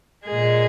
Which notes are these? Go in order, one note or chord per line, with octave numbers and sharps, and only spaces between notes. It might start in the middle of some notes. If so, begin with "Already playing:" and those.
A#2 G#3 G#4